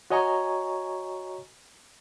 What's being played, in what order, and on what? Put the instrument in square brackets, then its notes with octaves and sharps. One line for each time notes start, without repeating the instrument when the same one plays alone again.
[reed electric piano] F#4 C#5 D#5 G#5 A#5 C#6